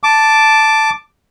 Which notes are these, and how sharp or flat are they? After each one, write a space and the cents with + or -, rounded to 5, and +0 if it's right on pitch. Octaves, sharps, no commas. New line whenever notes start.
A5 +0 D6 +0